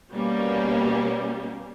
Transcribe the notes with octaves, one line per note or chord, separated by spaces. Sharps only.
B2 G3 A#3 C#4